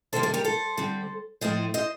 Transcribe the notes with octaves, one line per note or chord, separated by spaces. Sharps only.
C3 D#3 G3 A#3 A4 C5
A4 C5
G4 A#4
A4 C5
D3 G3 C4
A2 F3 A3 C4 C5 D#5
C5 D#5